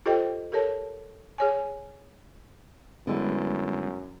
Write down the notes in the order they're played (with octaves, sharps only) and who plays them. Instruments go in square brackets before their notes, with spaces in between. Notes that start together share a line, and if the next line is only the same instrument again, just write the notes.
[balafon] F4 G4 A4 C5 D#5 G5
G4 A4 A#4 C#5 A5
G#4 C#5 G#5
[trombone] F#2 [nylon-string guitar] D3 E4 B4 [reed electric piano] G3 G#3 B3